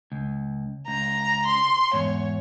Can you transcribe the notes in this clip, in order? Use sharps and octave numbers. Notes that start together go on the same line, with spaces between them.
C#2
C#2 A#5
C6
E2 G#2 C#5